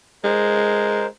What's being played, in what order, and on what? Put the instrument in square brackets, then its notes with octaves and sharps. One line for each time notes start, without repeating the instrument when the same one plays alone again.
[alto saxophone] G#3 [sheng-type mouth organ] A#4 C5